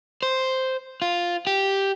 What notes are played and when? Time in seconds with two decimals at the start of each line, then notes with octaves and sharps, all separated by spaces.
0.23 C5
1.02 F4
1.47 G4